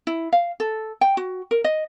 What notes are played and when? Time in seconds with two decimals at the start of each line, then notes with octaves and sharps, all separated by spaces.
0.07 E4
0.33 F5
0.60 A4
1.01 G5
1.17 F#4
1.51 A#4
1.64 D#5